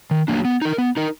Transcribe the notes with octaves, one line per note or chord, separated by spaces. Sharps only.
D#3
F#3 A#3 D4
B3
D#4 A#4
B3
D#4 A#4